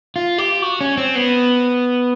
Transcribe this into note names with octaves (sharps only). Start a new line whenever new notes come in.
F4
G4
F#4
C#4
C4
B3